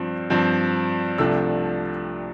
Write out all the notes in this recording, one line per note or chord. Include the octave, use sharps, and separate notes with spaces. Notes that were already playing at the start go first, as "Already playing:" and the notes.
Already playing: G2 F3 C4
G2 F3 C4
C2 C3 F3 A3 D4 E6